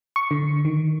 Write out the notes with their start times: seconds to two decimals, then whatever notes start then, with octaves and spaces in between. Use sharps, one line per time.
0.16 C#6
0.31 D3
0.65 D#3